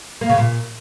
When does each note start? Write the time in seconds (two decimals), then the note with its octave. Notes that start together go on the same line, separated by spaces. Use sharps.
0.21 A#3
0.29 C#3
0.38 A#2